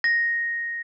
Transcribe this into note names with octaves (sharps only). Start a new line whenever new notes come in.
A#6